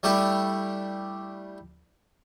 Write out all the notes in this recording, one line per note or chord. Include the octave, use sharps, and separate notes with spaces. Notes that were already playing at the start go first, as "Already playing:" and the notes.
G3 A3 D4 E4 G4 A4